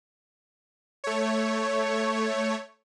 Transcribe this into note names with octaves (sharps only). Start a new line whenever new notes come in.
A3 C#5